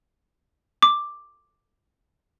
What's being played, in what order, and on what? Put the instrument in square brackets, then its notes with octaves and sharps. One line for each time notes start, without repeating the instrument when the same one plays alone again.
[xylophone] D6